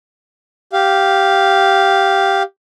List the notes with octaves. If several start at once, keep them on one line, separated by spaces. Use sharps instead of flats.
G4 F5